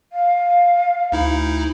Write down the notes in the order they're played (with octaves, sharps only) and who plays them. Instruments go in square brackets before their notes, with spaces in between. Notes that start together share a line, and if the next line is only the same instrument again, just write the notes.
[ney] F5
[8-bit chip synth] D2 D#4 E4